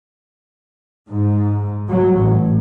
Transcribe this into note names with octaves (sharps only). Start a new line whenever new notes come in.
G#2
F#3
A1